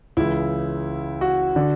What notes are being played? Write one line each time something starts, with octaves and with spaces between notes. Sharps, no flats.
C#2 C#3 E3 E4
F#4
D3